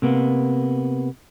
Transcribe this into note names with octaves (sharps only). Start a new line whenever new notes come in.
C3 A#3 B3